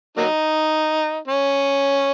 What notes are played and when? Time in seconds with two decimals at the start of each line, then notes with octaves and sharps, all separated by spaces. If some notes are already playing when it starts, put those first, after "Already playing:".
0.17 F#3 A#3 D#4
1.28 C#4